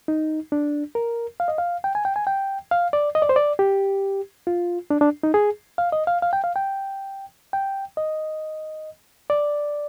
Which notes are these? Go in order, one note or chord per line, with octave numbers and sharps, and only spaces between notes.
D#4
D4
A#4
F5
D#5
F5
G5
G#5
G5
G#5
G5
F5
D5
D#5
D5
C5
D5
G4
F4
D4
D4
D#4
G#4
F5
D#5
F5
F5
G5
F5
G5
G5
D#5
D5